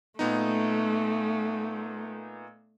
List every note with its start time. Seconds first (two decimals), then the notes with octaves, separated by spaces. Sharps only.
0.19 A#2 A3 B3 D#4